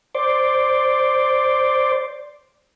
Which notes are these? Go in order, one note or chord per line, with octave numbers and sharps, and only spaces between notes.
C5 D5